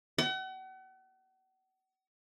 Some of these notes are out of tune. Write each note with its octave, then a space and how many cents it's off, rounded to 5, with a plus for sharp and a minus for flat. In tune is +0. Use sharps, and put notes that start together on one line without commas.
F#5 +40